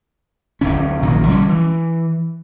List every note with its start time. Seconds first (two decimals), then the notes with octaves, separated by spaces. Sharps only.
0.61 D1 A#1 D3 C#4
1.02 A#1 A#2 D#3 F#3
1.27 D3 G3 A3 C#4
1.49 E3